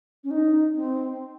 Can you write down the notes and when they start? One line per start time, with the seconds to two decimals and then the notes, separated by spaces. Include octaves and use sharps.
0.24 C#4
0.31 D#4
0.74 C4